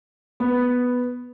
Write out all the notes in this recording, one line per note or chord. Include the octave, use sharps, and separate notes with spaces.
B3